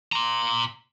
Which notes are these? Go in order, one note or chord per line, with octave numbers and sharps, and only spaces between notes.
A#5 C6